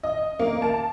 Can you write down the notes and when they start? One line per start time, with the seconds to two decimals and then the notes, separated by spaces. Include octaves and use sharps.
0.03 D#5
0.39 A#3
0.62 A5